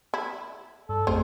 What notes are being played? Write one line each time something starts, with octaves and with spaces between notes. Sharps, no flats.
E4
G2 A4
A1 F2 A3 G#4 C5